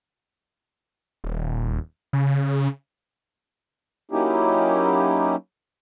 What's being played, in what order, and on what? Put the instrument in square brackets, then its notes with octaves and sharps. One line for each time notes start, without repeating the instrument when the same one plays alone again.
[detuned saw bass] D#1
C#3
[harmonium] F#3 A#3 C#4 D#4 E4 G4